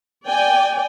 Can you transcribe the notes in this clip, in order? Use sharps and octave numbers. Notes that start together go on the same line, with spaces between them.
D5 G5 G#5